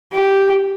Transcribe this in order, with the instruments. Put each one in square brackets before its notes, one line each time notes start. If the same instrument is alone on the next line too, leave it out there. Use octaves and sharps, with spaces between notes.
[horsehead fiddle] G4